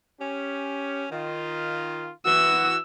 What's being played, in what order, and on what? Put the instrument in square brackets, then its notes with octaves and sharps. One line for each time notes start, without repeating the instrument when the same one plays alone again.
[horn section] C#4 G4
D#3 F4
[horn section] E3 F#4 [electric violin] E6